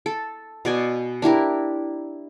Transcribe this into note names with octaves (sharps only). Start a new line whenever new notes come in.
A4
B2 D5 G#5
D4 E4 G4 A#4